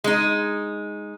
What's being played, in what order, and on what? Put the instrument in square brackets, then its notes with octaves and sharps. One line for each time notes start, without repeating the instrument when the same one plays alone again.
[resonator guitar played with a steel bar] G#3 D#4